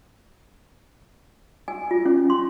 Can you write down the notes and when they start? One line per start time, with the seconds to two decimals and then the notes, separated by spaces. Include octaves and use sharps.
1.68 G#5
1.91 F4
2.06 C#4
2.30 C6